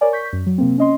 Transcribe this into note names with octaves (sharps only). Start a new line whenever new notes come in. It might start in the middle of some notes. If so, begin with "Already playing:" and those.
A#4 C#5 D5 G#5
C#6 G6 B6
F#2
F#3
C3 A#3 C4
C#4 D#5 C6